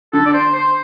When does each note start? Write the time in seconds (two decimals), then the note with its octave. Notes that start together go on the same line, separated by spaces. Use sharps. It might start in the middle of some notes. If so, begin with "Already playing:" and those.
0.13 D3 A4
0.26 D5
0.34 C5
0.55 C5